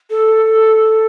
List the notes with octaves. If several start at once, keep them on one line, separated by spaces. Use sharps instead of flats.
A4